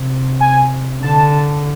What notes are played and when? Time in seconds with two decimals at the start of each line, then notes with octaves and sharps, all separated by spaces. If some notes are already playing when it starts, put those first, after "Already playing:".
Already playing: C3
0.40 G#5
1.02 D3 A5